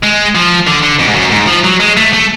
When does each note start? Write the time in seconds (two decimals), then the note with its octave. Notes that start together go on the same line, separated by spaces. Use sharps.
0.03 G#3
0.35 F3
0.67 D3
0.83 D3
1.00 F2
1.08 G#2
1.16 F#2
1.32 G#2
1.48 F3
1.64 F#3
1.80 G#3
1.97 A3
2.13 A3